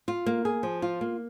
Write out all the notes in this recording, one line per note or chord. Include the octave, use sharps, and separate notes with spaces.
F4
A#3
G#4
F3
F4
A#3